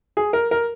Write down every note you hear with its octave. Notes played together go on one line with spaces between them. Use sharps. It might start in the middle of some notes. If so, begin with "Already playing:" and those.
G#4
A#4
A#4